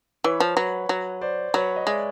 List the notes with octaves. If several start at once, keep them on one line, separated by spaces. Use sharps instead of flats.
E3 B4 C#5
F3
F#3 B4 C#5
F#3
C5 D5
F#3 B4 C#5
D#5
G#3 D5 E5